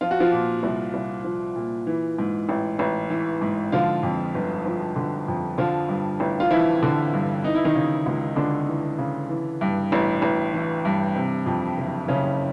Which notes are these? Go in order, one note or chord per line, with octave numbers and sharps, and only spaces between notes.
F3 F4
F#4
F3 F4
A#2
C2
C2
F3
A#2
E3
G#2
A1
A1
E3
G#2
D3 F3 F4
F2
G1
F3
D3
F2
D3 F3 F4
G2
A1
F4
E3 F3 E4
D3
G2
E3 D#4
E4
D#3 D#4
C#3
C#2
C#2 D3 D4
E3
C#3
E3
G2
A1
A1
E3
G2
C3
F2
F#1
F#1 C#3 C#4